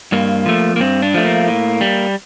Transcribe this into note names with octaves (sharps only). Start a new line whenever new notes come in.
G2 A#3
F3 A3
A#3
G2 C4
D4
F3 A3
A#3
A2
G3